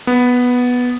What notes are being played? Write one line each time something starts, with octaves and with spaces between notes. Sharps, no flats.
B3